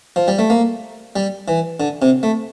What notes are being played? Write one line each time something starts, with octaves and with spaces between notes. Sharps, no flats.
F3
G3
A3
A#3
G3
E3
D3
C3
A3